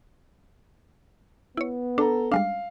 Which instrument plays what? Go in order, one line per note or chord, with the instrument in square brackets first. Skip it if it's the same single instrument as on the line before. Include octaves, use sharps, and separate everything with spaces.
[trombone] B3 [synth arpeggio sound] E4 C#5
[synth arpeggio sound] D4 [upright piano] A4 A#5
[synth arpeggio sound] G3 G#3 D4 [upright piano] F5